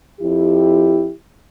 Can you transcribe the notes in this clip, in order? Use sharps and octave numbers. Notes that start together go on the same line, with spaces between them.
F2 E4 G4